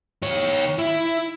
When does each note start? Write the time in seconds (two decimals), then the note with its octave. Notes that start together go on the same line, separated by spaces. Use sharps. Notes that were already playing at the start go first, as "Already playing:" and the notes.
0.22 D#3 C#5
0.78 E4